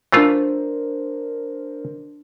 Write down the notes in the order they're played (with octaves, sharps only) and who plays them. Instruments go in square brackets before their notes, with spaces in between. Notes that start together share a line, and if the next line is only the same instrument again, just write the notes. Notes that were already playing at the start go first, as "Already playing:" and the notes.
[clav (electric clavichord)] E3 A3 F4 [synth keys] D4 A#4 C5